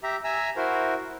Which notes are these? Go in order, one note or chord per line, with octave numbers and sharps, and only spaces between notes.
G4 E5 A#5
E5 G#5 A#5 E6
E4 F#4 A#4 C5